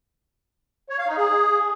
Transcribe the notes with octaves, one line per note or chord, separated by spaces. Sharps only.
C#5
F5
D#4
G#4